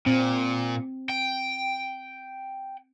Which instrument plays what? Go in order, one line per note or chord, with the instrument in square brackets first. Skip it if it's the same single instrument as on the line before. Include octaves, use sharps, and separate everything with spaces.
[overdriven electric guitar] A#2 [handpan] C4
[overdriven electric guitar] G5